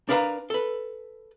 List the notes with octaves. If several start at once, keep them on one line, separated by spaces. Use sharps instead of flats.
D4 A#4 B4 F5 A#5
A4 B4